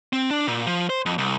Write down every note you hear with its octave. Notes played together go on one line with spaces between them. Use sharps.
C4
D4
A#2
F3
C5
F2
C2